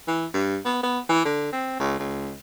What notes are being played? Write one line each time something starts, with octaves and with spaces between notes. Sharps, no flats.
E3
G2
B3
B3
E3
D3
C4
C#2
C#2